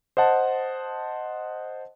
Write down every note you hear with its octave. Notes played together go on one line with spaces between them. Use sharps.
C5 D#5 F#5 A5